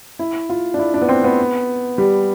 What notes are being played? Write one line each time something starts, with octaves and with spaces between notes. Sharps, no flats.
E4
F4
D4
E4
D4
B3
C4
B3
G3